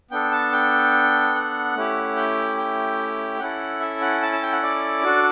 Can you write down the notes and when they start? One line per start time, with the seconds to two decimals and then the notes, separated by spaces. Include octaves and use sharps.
0.11 B3 D4 A4 G5
0.32 A5
0.52 G5
1.35 F#5
1.75 A3 C#4 E4 G4
2.16 G5
2.57 G5
3.39 C#4 E4 A4 F#5
3.80 E5
4.01 F#5
4.22 A5
4.32 A5
4.42 G5
4.52 F#5
4.63 D5
5.04 D4 F#4 A4